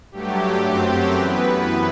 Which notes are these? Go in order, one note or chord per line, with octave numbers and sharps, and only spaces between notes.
G2 F#3 A3 G4
F#2 F#3 A3 C4 G4
F#2 E3 B3 B4